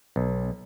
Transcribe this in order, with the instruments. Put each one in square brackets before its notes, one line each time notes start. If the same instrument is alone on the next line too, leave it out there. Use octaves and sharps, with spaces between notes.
[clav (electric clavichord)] B1